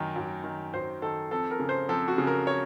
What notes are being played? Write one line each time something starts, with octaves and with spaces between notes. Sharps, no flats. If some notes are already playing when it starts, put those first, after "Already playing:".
Already playing: F#2 D#3
F#2
D#3
F#2 C5
D#3 A4
F2 A4
A#4
C#3
C5
F2 A4
F#4
C#3
A#4
C#5